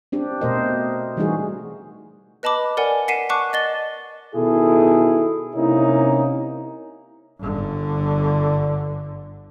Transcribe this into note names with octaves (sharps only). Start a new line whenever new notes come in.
C4 D4 G4
B2 A3 A#4 C5 D#5
E3 G3 A3 D#4 F#4 G#4
B4 D#5 A5 B5 D6
A#4 D5 F#5 G#5
F#5 B6 C7 D#7 E7
F#5 A5 C#6 D6 F#6
D#5 A6 G7
B2 D#3 E4 G#4 A4
C3 A#3 C#4 D#4 E4
G1 D3